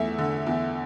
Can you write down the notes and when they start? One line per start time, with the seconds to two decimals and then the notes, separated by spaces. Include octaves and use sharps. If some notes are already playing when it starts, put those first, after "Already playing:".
Already playing: E2 A3 E5
0.18 D3
0.47 E2